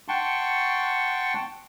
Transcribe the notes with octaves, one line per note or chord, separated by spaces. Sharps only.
F#5 G5 A5 C6 C#6